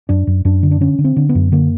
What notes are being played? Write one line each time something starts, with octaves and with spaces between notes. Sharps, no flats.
F#2 D4
F#2
F#2 D4
D3
D4
D3 C#4
D3
C4
D3
B3
F#2
D3 A#3